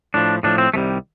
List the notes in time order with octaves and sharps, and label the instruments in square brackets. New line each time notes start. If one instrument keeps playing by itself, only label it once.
[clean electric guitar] A2 F3 D4
A2 F3 D4
C4
C2 C3 D#3 G3 A3